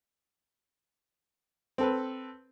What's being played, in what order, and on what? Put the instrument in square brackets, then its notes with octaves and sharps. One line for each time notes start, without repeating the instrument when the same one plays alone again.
[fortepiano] C4 A4 B4